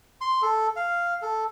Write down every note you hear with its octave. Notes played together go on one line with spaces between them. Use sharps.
C6
A4
F5
A4